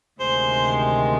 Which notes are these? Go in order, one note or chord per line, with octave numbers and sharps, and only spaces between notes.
D2 C3 D#3 G#3 D#4 C5